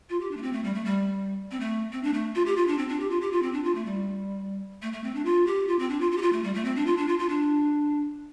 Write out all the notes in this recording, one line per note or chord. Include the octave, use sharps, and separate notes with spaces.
F4
G4
D4
A3
C4
A3
G3
A3
G3
C4
A3
C4
D4
A3
F4
G4
F4
D4
C4
D4
G4
F4
G4
F4
C4
D4
F4
A3
G3
A3
A3
C4
D4
F4
G4
F4
C4
D4
F4
F4
G4
F4
A3
G3
A3
C4
D4
F4
D4
F4
F4
D4